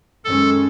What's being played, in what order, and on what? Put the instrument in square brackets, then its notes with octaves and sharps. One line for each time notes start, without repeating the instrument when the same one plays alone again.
[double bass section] F#2 D#3 G#3 C#4 [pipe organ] A4